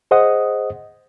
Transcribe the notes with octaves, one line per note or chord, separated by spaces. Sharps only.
G#4 C5 D#5 F#5 D#6